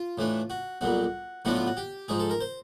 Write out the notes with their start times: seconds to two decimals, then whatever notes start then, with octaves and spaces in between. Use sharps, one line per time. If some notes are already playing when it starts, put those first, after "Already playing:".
Already playing: F4
0.18 A2 E3 A3 D4
0.50 F#4
0.81 B1 A#2 G3 F#4
1.45 A2 F#3 B3 D4 F4 F#4
1.55 F4
1.67 F#4
1.77 G4
2.08 G#2 F3 G#3 G#4
2.19 A4
2.30 A#4
2.41 C5